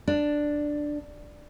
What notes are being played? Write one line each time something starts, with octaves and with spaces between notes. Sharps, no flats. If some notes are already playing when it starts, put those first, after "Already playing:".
D4